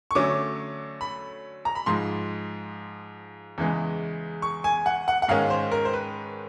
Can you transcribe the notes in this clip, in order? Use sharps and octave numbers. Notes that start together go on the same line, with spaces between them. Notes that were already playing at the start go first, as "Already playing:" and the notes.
C#6
D3 F#3 A3 C#4 D6
B5
A#5
B5
G#2 F3 G#3 C6
E2 C#3 E3 G#3
C#6
G#5
F#5
F#5
F#5
G#2 D#3 G#3 C#4 F5
C5
A#4
C5
B4